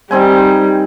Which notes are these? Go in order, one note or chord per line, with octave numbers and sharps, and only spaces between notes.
D#3 G3 C4 G#5